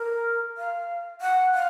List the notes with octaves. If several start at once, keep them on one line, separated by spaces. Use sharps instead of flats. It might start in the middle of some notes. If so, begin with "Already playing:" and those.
Already playing: A#4
F5
F#5
F5